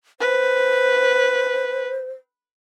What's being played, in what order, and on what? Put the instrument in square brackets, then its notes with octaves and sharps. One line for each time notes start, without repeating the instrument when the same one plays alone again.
[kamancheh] B4 [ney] C5